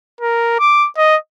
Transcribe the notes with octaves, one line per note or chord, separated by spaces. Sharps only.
A#4
D6
D#5